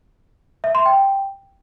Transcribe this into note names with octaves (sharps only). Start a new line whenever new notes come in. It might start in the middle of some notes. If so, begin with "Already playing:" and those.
E5
C6
G5